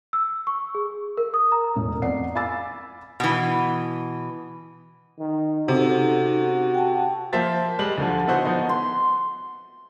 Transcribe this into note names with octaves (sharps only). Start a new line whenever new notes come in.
E6
C#6
G#4
A#4
D#6
A#5
E1 A2 C#4
F2 A#4 D5 F#5 C7
F5 G#5 B5 D6 E6 A6
B2 E3
D#3
C3 C#4 D#4 F#4 A4
G5 A5
F3 A#3 C5 E5 A6
G3 G#3 G4 F#7
D2 D3 F3
B3 D#4 E4 F#4 C5
F3 B3 D#4
C6